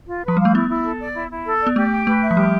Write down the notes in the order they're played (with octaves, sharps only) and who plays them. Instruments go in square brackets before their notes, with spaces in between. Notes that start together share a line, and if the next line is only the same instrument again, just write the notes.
[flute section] F4
[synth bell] F3 [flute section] B4
[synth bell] G3 [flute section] F5
[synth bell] A3
[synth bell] B3 [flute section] E4
[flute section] E4
A4
D5
E4
E4
A4
D5
[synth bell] B3
[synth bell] A3 [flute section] G4
[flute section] G5
[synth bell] A3 [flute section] B4
[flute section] E5
[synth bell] F3
[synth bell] G3 [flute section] G4